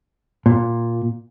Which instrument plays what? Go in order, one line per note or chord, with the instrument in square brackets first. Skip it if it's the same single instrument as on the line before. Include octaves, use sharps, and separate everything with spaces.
[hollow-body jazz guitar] A#2